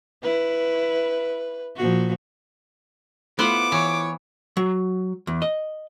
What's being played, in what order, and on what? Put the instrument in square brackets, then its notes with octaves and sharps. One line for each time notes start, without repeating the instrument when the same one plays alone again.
[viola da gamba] E4 [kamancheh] B4
[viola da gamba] A#2 F3 F#4
[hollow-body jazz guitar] A3 E4 F4 [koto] B3 C5 F#5 [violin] D6
[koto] E3 [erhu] C#5
[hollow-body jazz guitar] F#3
E2
D#5